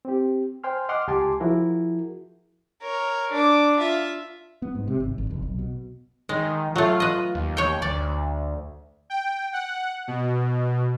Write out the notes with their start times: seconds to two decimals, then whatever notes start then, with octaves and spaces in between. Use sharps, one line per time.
0.05 C4 G4
0.64 C5 G5 G#5 C6 F6
0.89 D#5 F#5 C6 D6 F6
1.08 C#2 G4 G#5 A5 C6 D6
1.40 F3 E4 F#4 G#4 A#4
2.82 A#4 C#5
3.32 D4 D6
3.80 F4 E5
4.62 B3
4.75 G#2
4.88 C3
5.00 G#1
5.18 G#1
5.30 F1
5.42 B1
5.59 B2
6.29 D#3 G#3
6.76 F#3 A3 F4
7.00 B4 D#5
7.35 D#2
7.57 C#5 G5
7.82 D2 D5
9.10 G5
9.53 F#5
10.08 B2